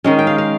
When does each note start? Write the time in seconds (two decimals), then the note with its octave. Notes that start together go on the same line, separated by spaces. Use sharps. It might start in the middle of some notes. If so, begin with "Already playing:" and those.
0.04 D#3 G#3 C#4 D#5
0.19 G5
0.27 F5
0.38 F5